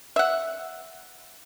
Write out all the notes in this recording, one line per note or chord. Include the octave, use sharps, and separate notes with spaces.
E5 F#5